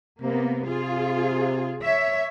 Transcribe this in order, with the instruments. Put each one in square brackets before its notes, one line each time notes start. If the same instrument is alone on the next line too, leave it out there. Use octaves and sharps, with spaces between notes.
[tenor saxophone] C3 [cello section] A#3 B3
[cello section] F4 G#4
C#5 E5